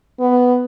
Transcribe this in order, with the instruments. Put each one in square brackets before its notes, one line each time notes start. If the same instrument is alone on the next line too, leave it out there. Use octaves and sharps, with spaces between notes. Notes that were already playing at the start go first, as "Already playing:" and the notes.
[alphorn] B3